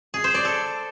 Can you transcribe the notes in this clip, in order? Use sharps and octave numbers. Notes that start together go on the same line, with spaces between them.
G#4
C5
D5
A4